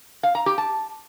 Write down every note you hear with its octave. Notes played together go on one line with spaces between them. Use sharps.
F5
A#5
G4
A5